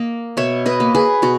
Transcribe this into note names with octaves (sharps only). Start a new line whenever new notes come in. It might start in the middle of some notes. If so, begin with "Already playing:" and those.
Already playing: A#3 D#5
B2 C#5 E5
B4 D#5
A#3
G#4 B4
B2 F#4